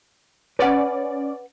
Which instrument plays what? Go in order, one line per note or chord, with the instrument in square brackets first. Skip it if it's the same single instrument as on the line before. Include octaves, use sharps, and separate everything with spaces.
[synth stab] C#4 D5 [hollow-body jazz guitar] B4 F#5